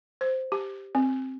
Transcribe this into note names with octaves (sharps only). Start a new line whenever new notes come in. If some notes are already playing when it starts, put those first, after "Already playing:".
C5
G4
C4